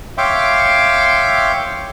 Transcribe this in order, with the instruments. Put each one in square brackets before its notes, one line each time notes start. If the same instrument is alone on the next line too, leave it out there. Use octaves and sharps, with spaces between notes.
[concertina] C#5 E5 F5 G5 C6 D6